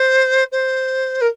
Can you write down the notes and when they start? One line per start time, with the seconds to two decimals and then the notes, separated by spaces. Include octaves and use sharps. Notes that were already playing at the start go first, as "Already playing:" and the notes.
Already playing: C5
0.52 C5
1.21 A#4